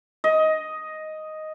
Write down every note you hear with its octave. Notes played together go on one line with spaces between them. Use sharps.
D#5